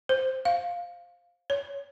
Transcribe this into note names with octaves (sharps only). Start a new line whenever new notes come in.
C5
F5
C#5